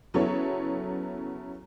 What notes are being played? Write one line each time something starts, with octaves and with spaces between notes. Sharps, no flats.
C#3 F#3 B3 E4 A4 C#5